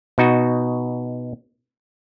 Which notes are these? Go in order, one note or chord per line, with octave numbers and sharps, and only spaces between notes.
B2 D#4 F#4